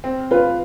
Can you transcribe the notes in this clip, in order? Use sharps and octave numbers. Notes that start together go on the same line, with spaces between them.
C4
F4 B4